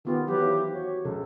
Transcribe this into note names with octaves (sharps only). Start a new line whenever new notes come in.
D#3 B3 F4 G4
E3 F#3 G4 B4
E4 C5 F5
F#4 C#5
C#2 A4